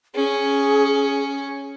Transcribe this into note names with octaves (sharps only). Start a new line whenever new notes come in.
C#4 G#4